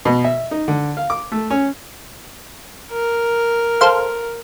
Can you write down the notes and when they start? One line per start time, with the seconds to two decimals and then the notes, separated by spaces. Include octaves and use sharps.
0.05 B2
0.24 E5
0.51 D#4
0.68 D3
0.97 F5
1.10 D6
1.32 A3
1.50 C#4
2.92 A#4
3.81 A4 C5 F5